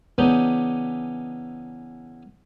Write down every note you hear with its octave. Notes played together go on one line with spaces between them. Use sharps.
C#3 E3 B3 D4 D#4 G4